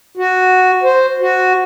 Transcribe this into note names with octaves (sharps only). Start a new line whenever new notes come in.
F#4
C5
F#4